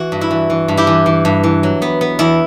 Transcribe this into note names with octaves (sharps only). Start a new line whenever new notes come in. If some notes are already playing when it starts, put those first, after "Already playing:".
Already playing: E3 F#4
G2
E4
E3
E3
G2
E4 G4
E3
E3
G2
E3
F#3
B3
B3
E2 E4